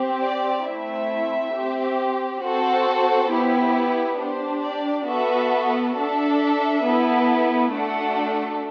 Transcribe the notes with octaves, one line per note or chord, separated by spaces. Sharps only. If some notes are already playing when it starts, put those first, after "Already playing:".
Already playing: C4 G4
D5
A3 C4 E4 E5
C4 G4
C4 F#4 A4 C5
B3 E4 G4
D4 G4 C5
D5
B3 F#4 A4 E5
D4 A4 E5
B3 E4 A4
A3 D4 F#4 A4 F#5